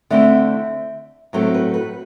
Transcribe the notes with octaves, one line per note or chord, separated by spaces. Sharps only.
D3 A3 C4 E4 E5
A2 F#3 A3 C4 C5
B4
B4